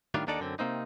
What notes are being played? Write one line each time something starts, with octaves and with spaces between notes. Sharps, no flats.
A2 D#3 G3 D4 F4
D#2 D#3 D4 D#4 A4 D5
F#2 D3 C4
C3 A#3 C4 D#4